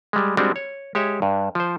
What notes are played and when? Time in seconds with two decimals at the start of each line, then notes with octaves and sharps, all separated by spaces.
0.13 G3 G#3
0.37 G3 G#3 C4 D4 F#4
0.56 C#5
0.95 G#3 G4 C#5 E5
1.22 G2
1.55 F3 C5